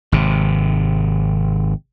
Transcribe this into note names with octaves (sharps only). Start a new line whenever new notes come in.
G#1 C3